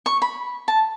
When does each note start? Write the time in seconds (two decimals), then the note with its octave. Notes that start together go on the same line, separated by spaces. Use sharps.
0.06 C#6
0.22 B5
0.68 A5